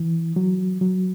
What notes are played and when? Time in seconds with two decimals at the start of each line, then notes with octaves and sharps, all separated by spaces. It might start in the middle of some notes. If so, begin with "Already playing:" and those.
Already playing: E3
0.36 F#3
0.81 F#3